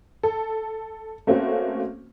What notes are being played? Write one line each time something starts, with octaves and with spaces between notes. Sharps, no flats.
A4
A3 A#3 C4 C#4 F#4